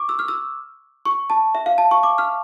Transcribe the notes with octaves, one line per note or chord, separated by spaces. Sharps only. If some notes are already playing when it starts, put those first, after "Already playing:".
Already playing: C#6 D6
E6
F6
E6
C#6
A5
E5
F5
A5
C#6
D6
F6